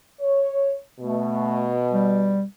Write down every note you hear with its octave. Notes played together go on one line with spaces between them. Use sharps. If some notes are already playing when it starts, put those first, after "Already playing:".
C#5
B2 A3
G3